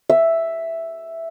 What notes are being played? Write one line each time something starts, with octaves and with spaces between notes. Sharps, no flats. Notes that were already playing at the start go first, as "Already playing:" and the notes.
E5